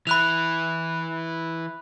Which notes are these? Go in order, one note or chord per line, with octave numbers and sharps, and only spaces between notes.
E3 E4 B5 F#6 F7